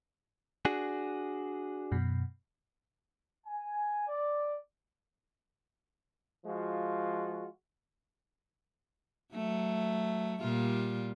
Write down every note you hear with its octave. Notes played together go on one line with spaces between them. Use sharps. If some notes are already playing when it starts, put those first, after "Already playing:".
D4 F#4 G#4
F#2 B2
G#5
D5
F3 G#3 F4 F#4
F#3 A3
A#2 G3 F4